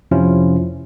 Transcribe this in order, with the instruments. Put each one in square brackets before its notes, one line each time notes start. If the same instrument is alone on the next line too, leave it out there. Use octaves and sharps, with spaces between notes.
[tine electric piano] F2 C3 F3 C#4 E4 F4